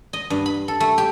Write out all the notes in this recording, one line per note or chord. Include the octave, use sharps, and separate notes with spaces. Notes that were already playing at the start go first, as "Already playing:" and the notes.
D#5
G2
B5
A4
A3
G4